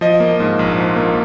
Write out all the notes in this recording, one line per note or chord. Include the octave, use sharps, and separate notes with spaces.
F3 D#5
A#3
G#2
A#1
F3
A#3